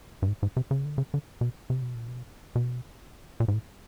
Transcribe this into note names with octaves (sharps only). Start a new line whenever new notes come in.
G2
G#2
G#2
C3
C#3
D3
C#3
D3
B2
C3
B2
A#2
B2
B2
A#2
G#2
A2